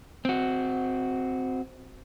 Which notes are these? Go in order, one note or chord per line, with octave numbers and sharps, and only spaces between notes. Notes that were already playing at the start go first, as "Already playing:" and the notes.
C4 F#4